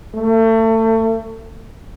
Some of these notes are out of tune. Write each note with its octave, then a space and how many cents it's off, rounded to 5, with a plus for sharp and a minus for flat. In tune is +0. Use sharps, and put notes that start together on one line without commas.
A3 +30